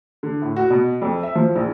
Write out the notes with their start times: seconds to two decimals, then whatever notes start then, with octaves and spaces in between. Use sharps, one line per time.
0.23 D3
0.42 A2
0.56 F#4
0.70 B2
1.02 F2
1.23 E5
1.35 F3
1.56 A#1